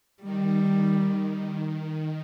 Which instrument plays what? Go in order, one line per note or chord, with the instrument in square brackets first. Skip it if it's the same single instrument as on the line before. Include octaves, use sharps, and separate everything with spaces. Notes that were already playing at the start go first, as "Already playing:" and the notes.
[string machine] D#3 [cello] G3